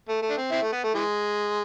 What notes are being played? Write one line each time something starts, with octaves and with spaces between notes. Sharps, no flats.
A3
A3
D4
C4
C4 E4
A3
B3
A3
E3 G#3